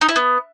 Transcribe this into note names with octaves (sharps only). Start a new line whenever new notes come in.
D#4
E4
B3